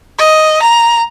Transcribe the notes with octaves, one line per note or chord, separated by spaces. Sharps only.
D#5
A#5